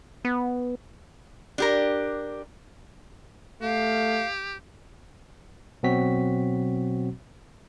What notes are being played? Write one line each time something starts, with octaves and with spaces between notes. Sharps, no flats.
B3
D4 G4 A#4
A3 G4 F5
B2 F#3 C4 F#4 B6